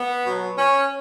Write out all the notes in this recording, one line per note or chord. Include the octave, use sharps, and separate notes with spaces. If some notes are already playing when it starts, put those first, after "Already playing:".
Already playing: B3
B2 F#3
C#4